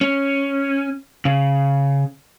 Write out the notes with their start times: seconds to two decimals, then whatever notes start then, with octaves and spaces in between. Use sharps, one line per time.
0.01 C#4
1.25 C#3